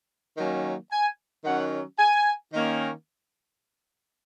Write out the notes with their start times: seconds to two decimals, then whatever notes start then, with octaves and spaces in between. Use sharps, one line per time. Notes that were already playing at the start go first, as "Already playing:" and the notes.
0.37 D#3 F#3 A#3 C#4
0.91 G#5
1.45 D#3 F#3 C#4 F#5
1.99 G#5
2.53 D#3 A#3 C#4